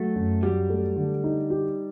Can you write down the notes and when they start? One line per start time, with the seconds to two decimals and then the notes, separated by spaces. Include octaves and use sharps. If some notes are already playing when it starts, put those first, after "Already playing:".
Already playing: F#3 A3
0.16 F#2
0.43 F#3 G3
0.70 A3
0.96 D3
1.24 D#4
1.50 G4